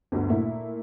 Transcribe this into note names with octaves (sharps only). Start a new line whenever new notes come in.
G1 D2
A#2 A3 A#3 E4